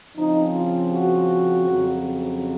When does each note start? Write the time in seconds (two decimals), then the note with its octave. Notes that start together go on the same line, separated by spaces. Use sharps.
0.17 C#3 F3 C4 D#4
0.55 F4
0.94 F#4
1.69 F2 C#3 F#3 C4